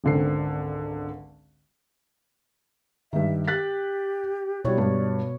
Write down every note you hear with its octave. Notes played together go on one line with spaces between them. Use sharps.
G#1 C#2 D3 C4 C7
G2 D#3 E5
G4 F#6 A6 B6
B2 G3 E4 C#5 D5
G2